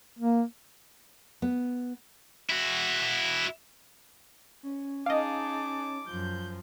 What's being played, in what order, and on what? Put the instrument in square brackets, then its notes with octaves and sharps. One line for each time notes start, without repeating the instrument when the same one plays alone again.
[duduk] A#3
[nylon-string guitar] B3
[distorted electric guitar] E4 F#4
[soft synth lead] C#4
[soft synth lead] C#4 [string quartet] D#4 G#4 A5 [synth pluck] D#5 F5 [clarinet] D6
[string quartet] F#2 F3 [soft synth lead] G6